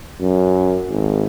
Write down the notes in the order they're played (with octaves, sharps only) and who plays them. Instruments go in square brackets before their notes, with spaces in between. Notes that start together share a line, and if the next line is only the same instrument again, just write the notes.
[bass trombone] F#2
G#1